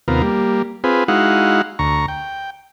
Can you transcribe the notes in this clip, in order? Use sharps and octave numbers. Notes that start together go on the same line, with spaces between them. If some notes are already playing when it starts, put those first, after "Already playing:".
D#2 C3 B3 F4 A#4
G3 A#3
C4 F4 G#4 B4
G#3 D#4 E4 F#4 F5 F#5
D2 A#5 C#6
G5